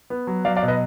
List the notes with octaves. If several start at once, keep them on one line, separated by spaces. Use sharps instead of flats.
B3
F#3
F#3 D5 F5
D5 F5
B2
B4 D#5